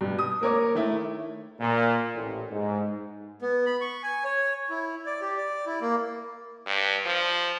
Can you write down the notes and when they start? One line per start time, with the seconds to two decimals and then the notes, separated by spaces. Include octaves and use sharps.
0.01 G2 B2
0.19 D#6
0.41 A#3 A#4 C#5 D6
0.75 D#3 A3 E4
1.60 A#2
2.13 A1
2.51 G#2
3.42 B3
3.66 B5
3.81 C#6
4.03 G#5
4.24 C#5
4.70 E4
5.06 D5
5.21 G4
5.38 D5
5.66 E4
5.82 A#3
6.66 G2
7.05 F3